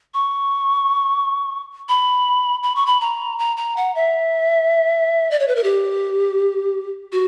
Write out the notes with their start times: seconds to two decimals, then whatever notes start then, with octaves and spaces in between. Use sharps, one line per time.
0.14 C#6
1.89 B5
2.63 B5
2.76 C#6
2.86 B5
3.01 A#5
3.39 A#5
3.57 A#5
3.77 F#5
3.95 E5
5.31 D5
5.40 C#5
5.48 B4
5.56 A#4
5.64 G4
7.12 F#4